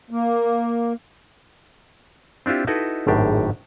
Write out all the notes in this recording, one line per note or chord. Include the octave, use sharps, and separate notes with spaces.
A#3
C4 D4 E4 F4 G4
D#4 E4 F#4 A4 B4 D#5
G#1 F#2 A2 D4 G4